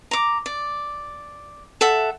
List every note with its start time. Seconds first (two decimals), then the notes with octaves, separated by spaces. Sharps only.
0.11 A#5 D6
0.46 D5
1.81 A4 E5 F#5